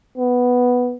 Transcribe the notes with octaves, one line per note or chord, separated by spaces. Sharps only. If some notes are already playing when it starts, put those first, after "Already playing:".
B3